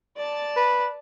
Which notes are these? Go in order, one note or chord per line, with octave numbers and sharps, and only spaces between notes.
D5 A5
B4